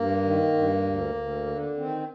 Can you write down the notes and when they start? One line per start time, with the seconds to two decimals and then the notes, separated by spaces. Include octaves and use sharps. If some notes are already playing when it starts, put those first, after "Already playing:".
Already playing: G2 A#3
0.23 D#3
0.54 G2
0.85 D2
1.15 D2
1.46 D3
1.76 D#3 C4